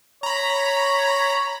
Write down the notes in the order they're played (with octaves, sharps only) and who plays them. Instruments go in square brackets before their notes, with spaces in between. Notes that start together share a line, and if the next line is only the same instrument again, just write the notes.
[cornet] C#5 [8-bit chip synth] A#5 B5